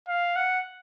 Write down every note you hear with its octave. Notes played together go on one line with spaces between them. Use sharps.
F5
F#5